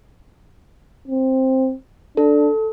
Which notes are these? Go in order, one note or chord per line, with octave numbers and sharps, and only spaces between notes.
C4
D4 A4